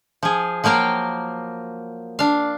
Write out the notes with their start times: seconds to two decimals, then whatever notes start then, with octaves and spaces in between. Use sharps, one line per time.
0.23 F3 G#4
0.64 F3 F#3 A#3 A#4 G5
2.19 D4 F5